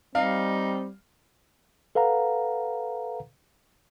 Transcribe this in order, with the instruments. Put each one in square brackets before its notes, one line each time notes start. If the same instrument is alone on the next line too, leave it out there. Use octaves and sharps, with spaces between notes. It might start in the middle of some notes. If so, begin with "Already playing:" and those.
[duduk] G3 [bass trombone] C4 [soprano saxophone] D#4 [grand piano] F5
[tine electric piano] A4 B4 F5 F#5 A#5